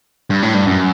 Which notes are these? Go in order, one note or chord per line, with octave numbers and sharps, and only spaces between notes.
G2
A2
G2
F#2